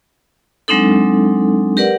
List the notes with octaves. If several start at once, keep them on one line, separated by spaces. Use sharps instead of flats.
F#3 G#3 C4 D4 D#4 A4
G4 A#4 B4 D5 F#5